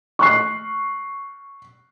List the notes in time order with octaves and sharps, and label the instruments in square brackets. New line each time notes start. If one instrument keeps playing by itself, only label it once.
[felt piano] C#6 F#6 C7